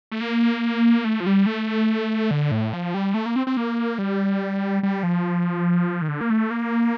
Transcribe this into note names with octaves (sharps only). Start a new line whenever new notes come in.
A3
A#3
A3
F3
G3
A3
D3
A2
F3
G3
A3
A#3
C4
C4
A#3
G3
G3
F3
D#3
D3
A#3
A3
A#3